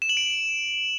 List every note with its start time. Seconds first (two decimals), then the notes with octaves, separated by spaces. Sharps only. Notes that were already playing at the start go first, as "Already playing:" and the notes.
0.02 E7
0.09 F#7
0.17 D7